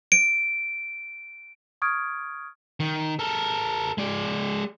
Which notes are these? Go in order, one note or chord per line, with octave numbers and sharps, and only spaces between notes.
D7
C#6 D#6 F6 G#6 D7
D#3
A4 A#4
G#3 D5